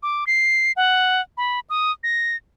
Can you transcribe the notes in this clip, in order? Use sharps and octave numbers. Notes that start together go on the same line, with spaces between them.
D6
C7
F#5
B5
D#6
A#6